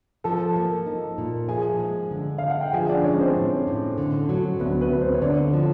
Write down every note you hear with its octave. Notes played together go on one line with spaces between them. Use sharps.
F3 A4 A5
A#3
D#4
A#2
F3 G#4 G#5
G#3
D3
D3 F5
F#5
G5
F3 G#4 G#5
D4 D5
G#3 C#4 C#5
C4 C5
A2
A2
D3
F#3
D2 B3 B4
B3 B4
D2
C4 C5
C#5
D3 D4 D5
F3